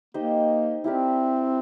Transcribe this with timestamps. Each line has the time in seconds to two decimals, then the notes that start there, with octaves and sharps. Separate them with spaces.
0.14 A#3 D#4 G4 C5 D#5
0.84 C4 E4 G4 A#4 D5